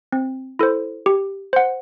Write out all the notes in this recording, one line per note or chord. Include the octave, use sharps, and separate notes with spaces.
C4
E4 A4 C5
G4
C5 F#5